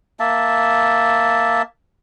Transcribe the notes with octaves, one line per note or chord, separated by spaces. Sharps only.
A#3 E5 A5